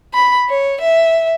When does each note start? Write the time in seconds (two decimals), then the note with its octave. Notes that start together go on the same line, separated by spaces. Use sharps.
0.14 B5
0.50 C#5
0.81 E5